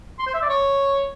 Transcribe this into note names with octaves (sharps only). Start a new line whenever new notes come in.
C6
C5
E5
D5
C#5